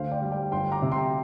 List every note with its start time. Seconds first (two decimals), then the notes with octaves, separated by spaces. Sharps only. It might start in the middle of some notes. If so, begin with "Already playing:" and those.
Already playing: D2 C5 F5
0.12 D5 G5
0.22 G3
0.32 D5 G5
0.52 G1 G5 C6
0.72 A#5 D6
0.82 C3
0.92 G5 C6